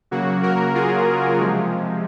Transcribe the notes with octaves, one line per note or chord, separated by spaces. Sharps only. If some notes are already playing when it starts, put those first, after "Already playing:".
C#3 F#3 A#3 F#4
F#4 A#4
F4 G#4
C3 F3 G#3